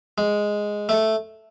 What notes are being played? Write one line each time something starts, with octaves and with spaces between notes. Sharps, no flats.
G#3
A3